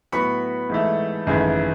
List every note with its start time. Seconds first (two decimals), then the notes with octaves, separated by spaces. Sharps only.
0.12 A2 F#3 B3 B5 C#6
0.70 G#2 E3 A3
1.27 G#1 F#2 C#3 E3 A3